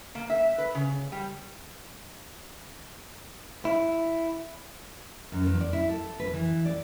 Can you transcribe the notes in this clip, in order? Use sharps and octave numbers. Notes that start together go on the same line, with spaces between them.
A#3
E5
B4
C#3
G3
E4
F#2
E2
D5
E4
A4
B4
E3
D5